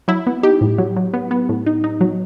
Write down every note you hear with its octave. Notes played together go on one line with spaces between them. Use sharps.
F#3 E4
B3
D#4 G4
A2
F#3
F#3
B3
B3
A2
D#4
D#4
F#3